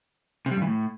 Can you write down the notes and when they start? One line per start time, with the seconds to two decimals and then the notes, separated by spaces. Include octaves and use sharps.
0.46 C3
0.51 G3
0.57 G2
0.62 E3
0.67 A2